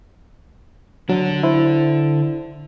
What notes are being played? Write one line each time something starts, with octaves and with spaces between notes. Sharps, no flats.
D3 F#3 D4
E4 C5